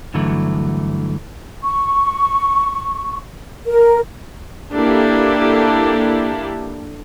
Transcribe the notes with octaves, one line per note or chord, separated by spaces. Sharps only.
G2 D3 E3 F#3 A3
C#6
A#4
A#3 D4 E4 G4 A4